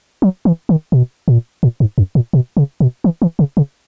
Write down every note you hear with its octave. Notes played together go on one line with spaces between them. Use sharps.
F#3
E3
D#3
B2
A#2
A#2
G#2
F#2
A#2
B2
C#3
B2
E3
E3
C#3
C#3